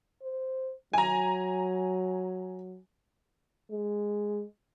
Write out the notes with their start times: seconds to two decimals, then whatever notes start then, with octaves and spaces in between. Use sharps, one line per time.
0.22 C5
0.93 F#3 G#5 A#5
3.71 G#3